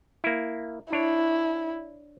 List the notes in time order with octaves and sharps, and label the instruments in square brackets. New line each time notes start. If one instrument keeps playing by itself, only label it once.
[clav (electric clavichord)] A#3 E4
[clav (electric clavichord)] D4 C#5 [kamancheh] E4